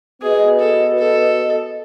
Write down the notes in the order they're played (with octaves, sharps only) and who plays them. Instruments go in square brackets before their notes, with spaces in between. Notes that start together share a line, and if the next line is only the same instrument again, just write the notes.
[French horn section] B3 F#4 B4 D#5 [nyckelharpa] G#4
[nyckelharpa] A4
A4